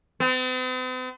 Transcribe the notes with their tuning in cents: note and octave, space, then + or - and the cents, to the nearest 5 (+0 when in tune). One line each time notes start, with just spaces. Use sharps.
C4 -45